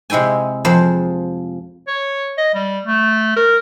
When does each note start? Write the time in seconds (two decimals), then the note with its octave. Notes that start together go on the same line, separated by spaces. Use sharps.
0.10 C3 G#3 E4 G5 G#5
0.65 F2 F3 F4 G#4 C5 F5
1.87 C#5
2.37 D#5
2.54 G3
2.85 A3
3.36 A#4